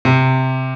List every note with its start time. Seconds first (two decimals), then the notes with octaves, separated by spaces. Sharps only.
0.05 C3